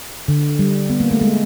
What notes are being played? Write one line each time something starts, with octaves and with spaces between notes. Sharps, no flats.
D3
G3
B3
A#3
A3
G#3